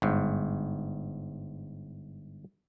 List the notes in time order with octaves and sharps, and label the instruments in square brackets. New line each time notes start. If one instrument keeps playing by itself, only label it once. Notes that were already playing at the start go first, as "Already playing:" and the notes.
[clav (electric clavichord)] G1 G#2